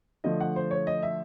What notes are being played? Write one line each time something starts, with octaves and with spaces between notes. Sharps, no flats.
D3 F3 A3 D#5
F#5
C5
C#5
D#5
E5